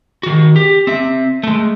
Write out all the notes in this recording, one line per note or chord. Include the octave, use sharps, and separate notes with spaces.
D#3 F#4
G4
C4 E5
G#3 A3